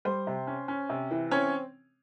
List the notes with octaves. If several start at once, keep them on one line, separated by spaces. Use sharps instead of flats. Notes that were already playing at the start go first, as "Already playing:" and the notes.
G3 C5
C3
C#4
C#4
C3
E3
C4 C#4 C#5